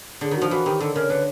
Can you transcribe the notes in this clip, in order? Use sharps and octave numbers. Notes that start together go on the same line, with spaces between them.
D3 G#4
D#3 F#4
F3
E3 F#4
D#3 G4
D3 A4
C#3 A#4
D3 B4